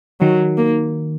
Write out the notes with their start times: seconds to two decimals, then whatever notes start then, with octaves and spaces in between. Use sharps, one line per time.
0.21 D#3 F#3
0.57 A#3